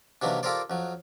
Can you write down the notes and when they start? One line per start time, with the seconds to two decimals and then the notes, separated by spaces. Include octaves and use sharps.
0.22 C3 D#3 E3 F#3 A#3 D4
0.43 F4 G4 A4 A#4 C5 D5
0.70 F2 F#3